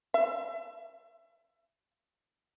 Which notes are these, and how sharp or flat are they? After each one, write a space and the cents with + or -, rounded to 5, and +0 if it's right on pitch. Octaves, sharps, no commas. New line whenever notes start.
E5 +25